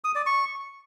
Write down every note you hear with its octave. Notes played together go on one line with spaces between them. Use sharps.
D#6
D5
C#6